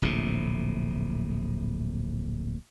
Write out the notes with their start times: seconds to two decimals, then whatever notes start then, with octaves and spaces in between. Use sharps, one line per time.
0.02 D1 A#1 A2 C3